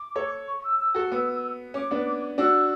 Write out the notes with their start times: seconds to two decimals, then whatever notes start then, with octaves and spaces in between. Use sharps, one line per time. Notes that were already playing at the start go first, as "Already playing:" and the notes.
Already playing: D6
0.16 A4 C#5
0.48 C#6
0.64 E6
0.80 E6
0.95 F#4 A4
1.12 B3
1.74 C#4 D6
1.91 B3 D4
2.38 D4 F#4 E6